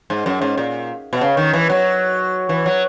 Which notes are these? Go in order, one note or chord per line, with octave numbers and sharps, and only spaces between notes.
G#2
F#2
G#2
A#2
B2
C#3
D#3
E3
F#3
E3
F#3